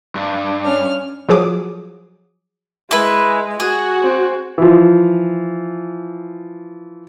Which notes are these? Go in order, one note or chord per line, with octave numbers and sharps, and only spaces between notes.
G2
C#4 F6
F3 F#3 G#4 D6 D#6
G#3 E4 B4
F#4 G#4
C4
E3 F3